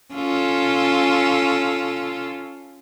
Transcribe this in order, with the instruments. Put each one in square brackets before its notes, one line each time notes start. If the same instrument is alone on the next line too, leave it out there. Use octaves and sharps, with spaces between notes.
[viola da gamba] C#4 F4 A4